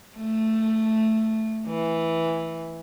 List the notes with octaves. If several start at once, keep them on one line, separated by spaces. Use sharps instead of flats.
A3
E3